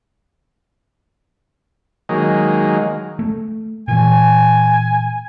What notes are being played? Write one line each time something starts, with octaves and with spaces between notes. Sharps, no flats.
D#3 F#3 G#3 A#3
A3
A#2 E3 G#5